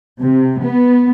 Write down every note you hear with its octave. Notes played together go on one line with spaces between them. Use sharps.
C3
B3